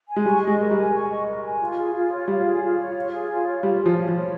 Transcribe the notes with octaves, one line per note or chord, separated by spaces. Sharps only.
G#5
G#3
G3 C#6
D#5
G#3
A#4
G3
G#5
C#6
D#5
A#4
G#5
F4
G#4
F4
C#5
G3 F4
G#4
F4
C#5
F4
G#4
F4
C#5
G3 F4
F3 G#4
F4
F3
C#5